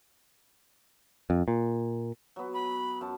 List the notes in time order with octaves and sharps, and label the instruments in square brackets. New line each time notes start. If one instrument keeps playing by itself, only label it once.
[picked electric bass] F2
A#2
[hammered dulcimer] F#3 B3
[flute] B5
[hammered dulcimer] F#2 A5